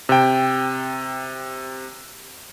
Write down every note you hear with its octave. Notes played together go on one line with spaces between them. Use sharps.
C3 G5